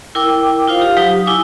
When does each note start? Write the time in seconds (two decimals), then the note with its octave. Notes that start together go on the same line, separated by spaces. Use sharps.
0.15 E4 A#4 G5 D6
0.68 D#4 F4 C5 F5
0.82 G4 F5
0.97 F#3 D#4 G4 D#6
1.26 D#4 E4 G#5 D6